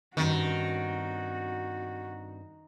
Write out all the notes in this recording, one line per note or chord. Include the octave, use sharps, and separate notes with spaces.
G2 D#3 C4 C#4 F#4